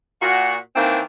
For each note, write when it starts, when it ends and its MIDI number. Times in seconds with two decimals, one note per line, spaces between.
0.21 0.56 46
0.21 0.56 66
0.76 1.00 51
0.76 1.00 52
0.76 1.00 58
0.76 1.00 60
0.76 1.00 62